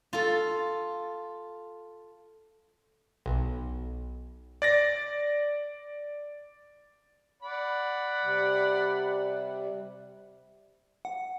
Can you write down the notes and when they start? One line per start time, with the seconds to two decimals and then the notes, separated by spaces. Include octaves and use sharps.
0.13 F4 A4
3.26 B1
4.62 D5 A6 A#6
7.42 D5 F#5 B5
8.24 C3 G3
11.05 F#5